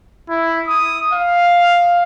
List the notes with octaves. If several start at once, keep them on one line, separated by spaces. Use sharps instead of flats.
E4
D#6
F5